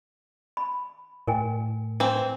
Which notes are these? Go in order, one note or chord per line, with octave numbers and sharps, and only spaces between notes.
B5
A2 A#4 G5 G#5
E3 C4